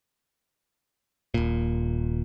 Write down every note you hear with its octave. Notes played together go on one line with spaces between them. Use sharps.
D#1 A#2